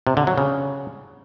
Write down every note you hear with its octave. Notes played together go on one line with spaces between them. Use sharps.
C3
D3
F#3
C#3